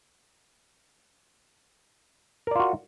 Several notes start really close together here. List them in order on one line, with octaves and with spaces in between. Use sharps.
A#4 D5 F4 F#4